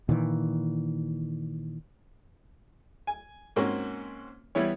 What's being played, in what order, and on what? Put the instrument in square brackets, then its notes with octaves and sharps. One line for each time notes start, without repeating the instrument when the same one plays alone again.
[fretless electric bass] A#2 D#3 E3
[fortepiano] G#5
G#2 A#3 C4 C#4 F#4
E3 G3 B3 E4 C#5